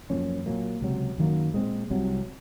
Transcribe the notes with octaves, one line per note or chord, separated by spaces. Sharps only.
F#2 F3 A#3 C#4
A#2 F#3 A#3
C#2 C3 F#3
F#2 D#3 F#3 A#3
A#2 G#3 C4
C2 C3 F#3